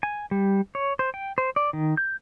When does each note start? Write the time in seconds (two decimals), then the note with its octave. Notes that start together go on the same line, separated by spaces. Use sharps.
0.03 G#5
0.31 G3
0.75 C#5
0.99 C5
1.14 G5
1.38 C5
1.56 D5
1.73 D#3
1.97 G6